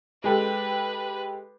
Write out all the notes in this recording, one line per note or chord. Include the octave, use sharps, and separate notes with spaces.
G#3 G4 A4 B4